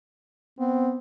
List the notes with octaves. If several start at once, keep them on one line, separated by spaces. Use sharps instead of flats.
B3 C4